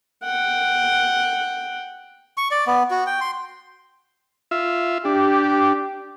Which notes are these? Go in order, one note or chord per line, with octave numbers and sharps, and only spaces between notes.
F#5 G5
C#6
D5
B3
F#4
G5
C6
F4 E5
D4 G4